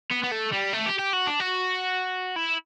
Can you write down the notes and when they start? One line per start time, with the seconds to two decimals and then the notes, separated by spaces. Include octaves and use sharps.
0.11 B3
0.23 B3
0.31 A3
0.52 G3
0.73 A3
0.86 G4
0.99 G4
1.13 F#4
1.27 D4
1.40 F#4
2.36 E4